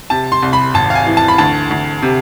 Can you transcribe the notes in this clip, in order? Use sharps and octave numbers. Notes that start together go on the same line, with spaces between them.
C3 A5
C6
C2
B5
G#1 A5
F5
G#5
E3
A5
B5
D2 A5
D2
C3